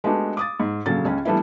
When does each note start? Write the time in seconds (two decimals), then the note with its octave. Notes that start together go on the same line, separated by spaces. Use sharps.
0.04 G#3 A3 B3 D4 F#4 G4
0.37 D6 D#6 A6
0.60 G#2
0.86 A#1 C#3 F#3 A4 A6
1.05 C#2 C#4
1.25 E3 G3 A3 B3 D4 E4